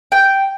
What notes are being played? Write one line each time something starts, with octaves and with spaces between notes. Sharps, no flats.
G5